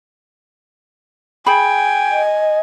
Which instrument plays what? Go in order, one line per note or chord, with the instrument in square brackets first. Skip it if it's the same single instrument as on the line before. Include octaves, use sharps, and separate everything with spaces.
[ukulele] G#4 B5 [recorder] G5 [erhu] G#5
[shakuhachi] D#5